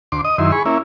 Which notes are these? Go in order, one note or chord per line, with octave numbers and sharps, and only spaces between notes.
D2 C6 D6
D#5 D#6
F#2 D#3 E4 C6
G#4 B5 C#6
A#3 C#4 E4